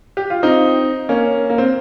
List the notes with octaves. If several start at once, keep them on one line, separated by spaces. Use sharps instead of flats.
G4
F4
C4 D#4
A#3 C#4
A#3
C4